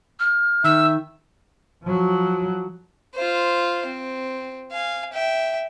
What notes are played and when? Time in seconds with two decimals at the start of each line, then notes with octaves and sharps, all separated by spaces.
0.19 F6
0.64 D#3 E5 E6
1.83 F3 F#3
3.15 F4 C5
3.86 C4
4.72 F5 G#5
5.13 E5 G5